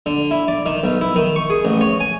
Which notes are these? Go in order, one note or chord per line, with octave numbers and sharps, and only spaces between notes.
D3
E4
D5
D#3
B1
E4
D#3
C#6
G#4
A1
C#5
G#5